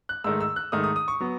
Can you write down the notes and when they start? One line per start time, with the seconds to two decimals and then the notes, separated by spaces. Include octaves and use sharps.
0.09 F#6
0.24 G#2 D#3 A3 E6
0.41 E6
0.56 F#6
0.72 G#2 D#3 A3 D#6
0.84 D#6
0.96 D#6
1.08 C#6
1.20 F#3 B3